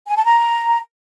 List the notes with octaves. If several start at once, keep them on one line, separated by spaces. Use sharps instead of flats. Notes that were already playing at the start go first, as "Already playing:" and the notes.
G#5
A5
A#5